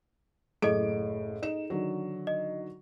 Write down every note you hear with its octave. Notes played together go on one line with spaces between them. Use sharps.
F#1 A2 G#4 A4 D#5 D7
D#4 E7
D3 D#3 F#3
D#5